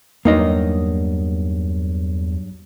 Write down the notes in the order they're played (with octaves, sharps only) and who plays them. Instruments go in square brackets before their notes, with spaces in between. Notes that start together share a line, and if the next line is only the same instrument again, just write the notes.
[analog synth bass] E2 [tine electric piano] G2 F#3 [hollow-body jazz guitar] A#3 D#4 D#5